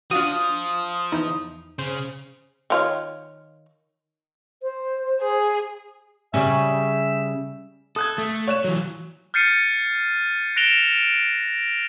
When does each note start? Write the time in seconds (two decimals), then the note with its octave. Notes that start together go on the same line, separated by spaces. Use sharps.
0.11 F3 D4 F4 F#4 D#6
1.12 E2 D#4 E4
1.79 C#3 C5
2.70 D#3 F4 C#5
4.63 C5
5.22 G#4
6.34 C#3 G3 C#4 E5
7.96 A4 D#6 F#6 G#6
8.18 A3
8.47 C#5 F#6 E7
8.64 E3 F#3
9.34 F6 G6 A6 C7 C#7 D#7
10.56 F#6 A#6 D7 E7 F7 G7